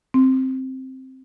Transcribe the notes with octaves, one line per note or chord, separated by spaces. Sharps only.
C4